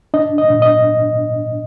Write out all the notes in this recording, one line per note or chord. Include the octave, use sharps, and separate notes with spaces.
D4 D#5
D#5
A#2
D#5